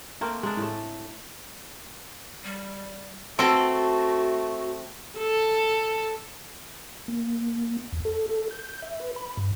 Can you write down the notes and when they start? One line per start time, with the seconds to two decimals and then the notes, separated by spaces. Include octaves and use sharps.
0.21 A3 A#3 C4
0.43 G#3 A#3 D4
0.57 A2 A3
2.44 G3
3.39 B2 A3 C4 F#4 A4
5.18 A4
7.08 A#3
7.93 E2
8.05 A4
8.29 A4
8.51 G6
8.82 E5
9.00 B4
9.16 B5
9.37 G2